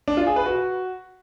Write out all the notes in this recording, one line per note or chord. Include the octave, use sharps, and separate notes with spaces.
D4
F4
G#4
B4
F#4